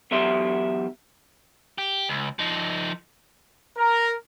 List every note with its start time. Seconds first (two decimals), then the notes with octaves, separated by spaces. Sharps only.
0.11 E2 F#3 G4 E5 C6
1.78 G4
2.09 C#2
2.39 F3 D#4
3.77 A#4